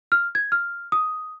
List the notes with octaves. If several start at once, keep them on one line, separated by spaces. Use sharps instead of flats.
F6
G#6
F6
D#6